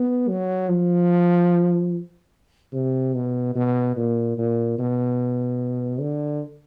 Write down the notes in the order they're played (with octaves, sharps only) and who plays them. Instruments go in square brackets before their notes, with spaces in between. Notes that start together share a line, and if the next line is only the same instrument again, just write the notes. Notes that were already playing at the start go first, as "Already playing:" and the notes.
Already playing: [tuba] B3
F#3
F3
C3
B2
B2
A#2
A#2
B2
D3